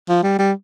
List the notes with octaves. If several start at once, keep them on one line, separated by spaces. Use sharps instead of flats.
F3
G3
G3